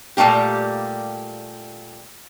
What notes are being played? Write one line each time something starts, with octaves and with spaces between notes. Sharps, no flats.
A#2 G3 A3 A#3 G4